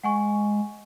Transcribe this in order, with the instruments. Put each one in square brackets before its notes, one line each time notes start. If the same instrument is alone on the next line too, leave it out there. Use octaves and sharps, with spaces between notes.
[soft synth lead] G#3 [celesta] F#5 G#5 C#6